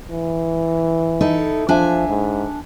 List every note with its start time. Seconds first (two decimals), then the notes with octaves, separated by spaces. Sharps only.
0.11 E3
1.21 D#4 E4 A4
1.69 F3 D4 E5 G#5
2.09 G#2